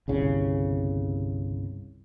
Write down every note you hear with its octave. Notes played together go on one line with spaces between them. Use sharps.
G1 C2 C#3